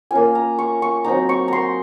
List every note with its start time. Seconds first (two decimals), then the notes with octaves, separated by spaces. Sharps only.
0.11 A#3 C#4 F4 G#5
0.35 A#5
0.59 C#6
0.82 C#6
1.04 F#3 C4 D#4 A#5
1.29 C#6
1.48 A#5 C6